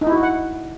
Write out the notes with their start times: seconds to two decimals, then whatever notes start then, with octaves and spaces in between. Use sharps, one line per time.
0.01 D#4
0.07 E4
0.12 F#4
0.18 E4
0.23 F#5